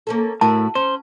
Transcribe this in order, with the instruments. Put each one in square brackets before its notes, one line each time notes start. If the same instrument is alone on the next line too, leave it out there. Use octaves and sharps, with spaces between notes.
[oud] A#3 C#4 A4
[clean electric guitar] A2 [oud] E4 F#4 A#4 [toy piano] A5
[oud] C#4 [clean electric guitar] C5